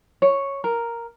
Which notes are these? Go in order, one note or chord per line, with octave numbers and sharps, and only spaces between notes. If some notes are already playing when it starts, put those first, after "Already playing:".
C#5
A#4